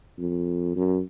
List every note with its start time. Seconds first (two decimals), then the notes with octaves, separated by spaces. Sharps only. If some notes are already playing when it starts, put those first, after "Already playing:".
0.19 F2
0.76 F#2